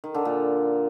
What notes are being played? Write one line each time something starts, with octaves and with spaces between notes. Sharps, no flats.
D#3
D3
A#2